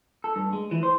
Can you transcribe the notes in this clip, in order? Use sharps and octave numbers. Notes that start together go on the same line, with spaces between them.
A4
G2
G#3
E3
C5